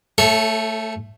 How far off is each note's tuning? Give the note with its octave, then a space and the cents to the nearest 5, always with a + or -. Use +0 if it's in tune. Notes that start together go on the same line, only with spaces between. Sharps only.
A3 +15 A4 -25 C#5 -15